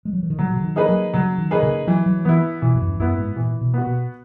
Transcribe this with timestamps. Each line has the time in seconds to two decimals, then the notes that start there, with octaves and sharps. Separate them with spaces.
0.05 G#3
0.13 F#3
0.23 E3
0.30 D#3
0.39 C#3 F#3
0.50 B2
0.56 C#3
0.63 D#3
0.76 A#3 D#4 G#4 B4
0.89 F#3
1.14 C#3 F#3
1.38 D#3
1.51 A#3 D#4 G#4 B4
1.63 C#3
1.87 E3 F#3
2.06 F#3
2.25 E3 B3 E4
2.62 B2 E3
2.75 E2
2.81 F#2
2.94 E2
2.99 F#2 B3 E4
3.18 G#2
3.36 A#2 E3
3.61 B2
3.74 B3 F#4
3.87 B2